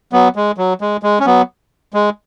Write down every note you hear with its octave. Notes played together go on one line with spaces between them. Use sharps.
F#3 B3
G#3
F#3
G#3
G#3
C#4
F#3 B3
G#3